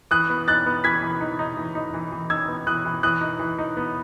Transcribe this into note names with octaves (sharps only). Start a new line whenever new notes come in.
E3 D#6 F#6
B3
D#4 F#6 A6
B3
E3 G#6 B6
E3
D#4
D#4
E3
D#4
E3
E3
D#4 E6 G#6
B3
E3 D#6 F#6
E3
E3 D#6 F#6
D#4
E3
D#4
B3